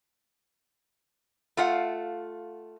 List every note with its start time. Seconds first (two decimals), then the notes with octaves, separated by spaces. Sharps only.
1.57 A3 F4 F5 F#5